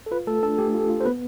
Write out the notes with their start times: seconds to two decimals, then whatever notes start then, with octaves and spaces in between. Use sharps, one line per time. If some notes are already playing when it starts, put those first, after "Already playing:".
0.06 A4
0.11 F4 B4
0.27 A3 A4
0.43 D4 A4
0.58 A3 G4
0.74 F4
0.90 F4
1.00 C5
1.05 B3 B4